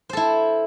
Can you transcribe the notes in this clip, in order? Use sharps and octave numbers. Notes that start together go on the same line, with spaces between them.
E4 A4 C5